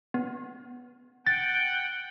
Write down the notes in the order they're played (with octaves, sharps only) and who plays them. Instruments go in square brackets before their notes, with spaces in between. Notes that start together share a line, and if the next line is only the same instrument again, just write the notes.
[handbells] B3
[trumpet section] F#5 G5 [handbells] A6